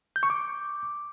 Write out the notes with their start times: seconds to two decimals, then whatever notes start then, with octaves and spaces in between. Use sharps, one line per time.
0.16 G6
0.23 C#6
0.30 D6